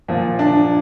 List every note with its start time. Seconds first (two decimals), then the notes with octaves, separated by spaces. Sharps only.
0.08 A#2 F3
0.39 D4